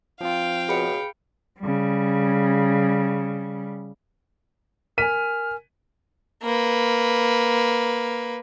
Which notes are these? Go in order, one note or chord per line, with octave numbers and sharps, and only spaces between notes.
F3 C4 F4 F5 G5
C#2 B2 G#4 B5 C#7
C#3 G3
A#4 G#5 F6 B6 D#7
A#3 B4